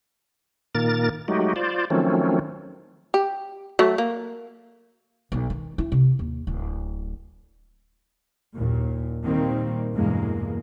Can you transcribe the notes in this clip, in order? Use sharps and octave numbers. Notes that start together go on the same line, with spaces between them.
A#2 D#3 A#3 A#4 A6
F#3 G#3 A3 D#4 F#4 G4
F4 C5 D5
D#3 F3 F#3 A3 C4 C#4
G4
F#3 A3
A#3
B1
D#3
E4
C3
D#2
D1
F#1 D#2 A#2
A#2 D#3 G3 A#3 C4
E2 G2 B2 G#3 A#3